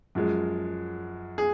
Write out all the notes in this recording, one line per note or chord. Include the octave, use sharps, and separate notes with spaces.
F#2 F3 G#3
G#4